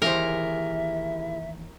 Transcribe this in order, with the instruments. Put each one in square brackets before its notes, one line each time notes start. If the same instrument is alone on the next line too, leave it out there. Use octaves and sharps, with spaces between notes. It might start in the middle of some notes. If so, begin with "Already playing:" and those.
[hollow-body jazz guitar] D#2 E3 C5 [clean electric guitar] E4 G4 G#4 [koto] A#4 [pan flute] E5